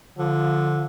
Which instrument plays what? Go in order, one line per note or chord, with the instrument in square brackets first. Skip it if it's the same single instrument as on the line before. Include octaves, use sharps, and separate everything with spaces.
[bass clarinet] D3 [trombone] F3